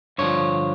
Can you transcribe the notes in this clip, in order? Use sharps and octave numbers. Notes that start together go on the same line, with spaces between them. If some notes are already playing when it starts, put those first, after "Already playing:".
G2 D3 F3 C#5